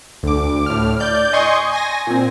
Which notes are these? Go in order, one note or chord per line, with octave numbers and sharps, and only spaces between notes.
D2 D6
A2 F6
D5 G6
D#5 G#5 C6 C#6 D#6
G#5 A#6
A#2 C4